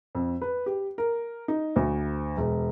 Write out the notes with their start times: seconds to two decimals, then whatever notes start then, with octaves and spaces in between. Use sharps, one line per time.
0.15 F2
0.42 B4
0.66 G4
0.98 A#4
1.48 D#4
1.76 D2
2.37 E1